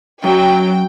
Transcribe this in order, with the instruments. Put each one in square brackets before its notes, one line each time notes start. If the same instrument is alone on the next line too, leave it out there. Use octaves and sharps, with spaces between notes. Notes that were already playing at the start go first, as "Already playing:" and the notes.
[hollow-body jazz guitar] F#2 [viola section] F#3 [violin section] G5